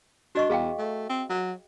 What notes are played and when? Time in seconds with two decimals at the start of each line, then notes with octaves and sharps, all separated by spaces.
0.35 D4 F#4 D#5 C#6
0.50 E2 G#4 F5 G5
0.79 A3
1.09 C4
1.30 F#3